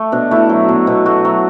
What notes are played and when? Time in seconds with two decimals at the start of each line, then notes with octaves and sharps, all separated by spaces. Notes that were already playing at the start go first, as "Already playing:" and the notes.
Already playing: A3
0.12 B2 D4
0.31 A3 E4
0.49 F#3
0.69 B2
0.87 B2
1.05 A3 F#4
1.25 F#3